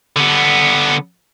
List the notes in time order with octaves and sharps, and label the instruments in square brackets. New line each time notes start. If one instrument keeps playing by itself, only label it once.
[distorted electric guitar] D3 B3